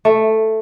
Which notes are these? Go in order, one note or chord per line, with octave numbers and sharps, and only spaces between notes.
A3